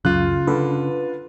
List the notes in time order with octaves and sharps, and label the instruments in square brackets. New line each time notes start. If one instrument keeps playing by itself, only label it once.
[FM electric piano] C#2 F#2 [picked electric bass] C#3 [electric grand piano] F4 F#6
[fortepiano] D3 [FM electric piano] B4